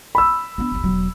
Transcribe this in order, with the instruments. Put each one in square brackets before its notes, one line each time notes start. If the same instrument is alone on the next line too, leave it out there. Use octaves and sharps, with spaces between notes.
[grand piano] B5 E6
[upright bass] B3 D4
G1 D#2
E1 F#3